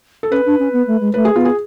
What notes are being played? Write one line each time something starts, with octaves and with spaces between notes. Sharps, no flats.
A4
C#4 B4
D4
C#4
B3
A3
G#3
A3 B4
G#4
B3 F4
G#4